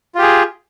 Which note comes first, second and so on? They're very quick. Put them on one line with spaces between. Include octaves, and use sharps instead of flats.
F4 G4 G#4